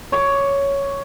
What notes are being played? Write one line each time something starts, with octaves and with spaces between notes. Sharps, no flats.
C#5 D6